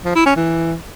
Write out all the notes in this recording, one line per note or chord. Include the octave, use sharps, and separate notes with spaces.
F3
E4
C#4
E3